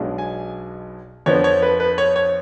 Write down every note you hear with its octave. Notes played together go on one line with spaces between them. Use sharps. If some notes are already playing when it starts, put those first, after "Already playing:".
Already playing: B1 B2 G#3 D4
G#5
F2 F3 B3 D4 C#5
C#5
B4
B4
C#5
C#5